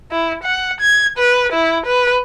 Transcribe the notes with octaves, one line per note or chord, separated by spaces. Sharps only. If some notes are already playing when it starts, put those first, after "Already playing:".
E4
F#5
G#6
B4
E4
B4